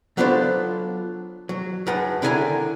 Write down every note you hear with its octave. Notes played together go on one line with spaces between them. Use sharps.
F#3 B3 D4 F4 A4 C5
F#3
F#2 G#3 D#4 B4 F#5 A5
D3 D#3 E4 G#4 G#5 A#5